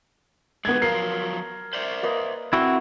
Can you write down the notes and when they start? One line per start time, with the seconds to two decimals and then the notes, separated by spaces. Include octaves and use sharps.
0.65 B2 D3 G#3 B3 G#6
0.82 F3 F#3 A#4 F5 C7
1.73 C5 D5 E5
2.03 A#3 B4 D#5
2.53 C4 E4 F#4 F#5